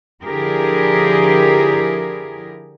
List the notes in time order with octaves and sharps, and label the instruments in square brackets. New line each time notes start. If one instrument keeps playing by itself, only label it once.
[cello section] D3 F3 E4 G4 G#4 A#4